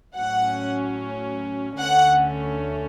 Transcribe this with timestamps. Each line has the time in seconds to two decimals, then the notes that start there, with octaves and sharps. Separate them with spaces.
0.17 A2 F#3 C#4 F#5
1.79 D2 D3 A3 C#4 F#5